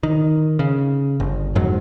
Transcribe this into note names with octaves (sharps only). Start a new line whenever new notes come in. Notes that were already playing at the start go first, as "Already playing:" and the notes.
D#3
C#3
G1
F2 G#2 F#3